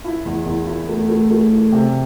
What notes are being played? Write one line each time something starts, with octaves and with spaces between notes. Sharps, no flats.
E4
E2
E2
E4
A3
A3
A3
E3
C3